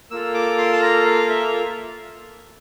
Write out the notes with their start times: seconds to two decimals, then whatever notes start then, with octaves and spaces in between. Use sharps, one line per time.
0.11 A#3 F4 A4 E6
0.34 D6
0.58 C6
0.73 A5
0.82 A#5
1.05 F5
1.29 E5